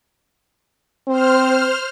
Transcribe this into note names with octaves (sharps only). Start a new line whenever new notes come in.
C4 C5 F6